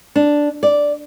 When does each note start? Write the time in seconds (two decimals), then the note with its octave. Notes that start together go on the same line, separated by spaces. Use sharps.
0.16 D4
0.63 D5